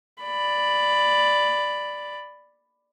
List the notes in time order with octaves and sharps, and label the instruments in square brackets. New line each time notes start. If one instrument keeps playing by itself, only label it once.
[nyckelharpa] D5 B5